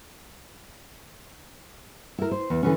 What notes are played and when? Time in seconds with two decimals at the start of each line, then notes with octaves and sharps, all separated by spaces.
2.18 E4 A#4
2.31 C5
2.50 E2
2.63 D3 E3 C#4